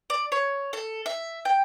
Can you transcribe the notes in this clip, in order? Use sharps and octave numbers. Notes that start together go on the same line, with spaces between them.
D5
C#5
A4
E5
G5